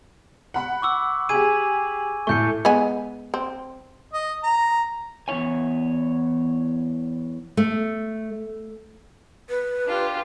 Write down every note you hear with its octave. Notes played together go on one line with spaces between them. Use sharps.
F#5 B5
C#6 D6 E6
G4 G#4 G#5 G#6 D#7
A2 A3 C#6 G6 C#7
G#3 B3 G#5
C4
D#5
A#5
E2 C#3 E4 C#5 G#5
A3
B4
D4 F4 G4